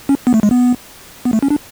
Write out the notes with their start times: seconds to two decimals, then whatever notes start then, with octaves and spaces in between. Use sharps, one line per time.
0.09 C#4
0.27 B3
0.34 A3
0.43 G#3
0.51 B3
1.25 B3
1.33 A3
1.43 C#4
1.50 D4